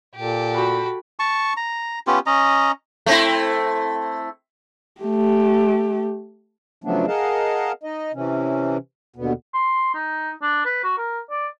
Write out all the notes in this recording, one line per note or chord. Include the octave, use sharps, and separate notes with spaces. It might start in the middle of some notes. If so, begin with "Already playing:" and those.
A#2 G4 A4
F#4 B5
A5 C#6
A#5
B3 C#4 F4 G4
C#4 D#5 A#5
A3 C4 E4
A3 G4
C#3 F3 F#3 A3 B3 D4
G#4 A#4 D#5 F5 F#5 A5
D#4 D#5
C3 E3 C#4
D#2 B2 D3 B3
C6
D#4
D4
B4
F#4
A#4
D5